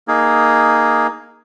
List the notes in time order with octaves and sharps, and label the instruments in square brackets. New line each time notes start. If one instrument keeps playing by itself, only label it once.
[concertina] A#3 D#4 G#4